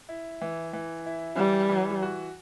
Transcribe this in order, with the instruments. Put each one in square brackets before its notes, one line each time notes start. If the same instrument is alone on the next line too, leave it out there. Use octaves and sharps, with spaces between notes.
[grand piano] E4
E3
E3
E4
[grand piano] E3 [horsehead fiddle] G3
[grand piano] E3
F#4